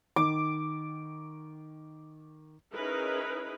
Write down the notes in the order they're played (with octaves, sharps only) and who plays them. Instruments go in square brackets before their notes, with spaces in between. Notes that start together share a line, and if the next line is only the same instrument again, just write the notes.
[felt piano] D#3 [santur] D6
[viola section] C#4 D#4 E4 G#4 A#4 B4